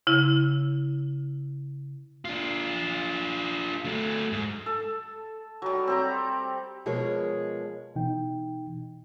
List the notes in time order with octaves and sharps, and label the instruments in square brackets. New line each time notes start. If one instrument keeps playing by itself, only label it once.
[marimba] C#3 E4
[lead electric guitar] D4 F4
F#3 A3
G#2
[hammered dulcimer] A4
F#3 G3
C4 G4 A#5
[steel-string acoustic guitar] B2 F3 G#3 G#4 A#4 C#5
[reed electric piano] B2 E3 D#4 G5